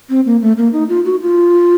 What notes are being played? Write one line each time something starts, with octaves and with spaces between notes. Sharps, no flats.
C4
A#3
A3
A#3
D#4
F4
F#4
F4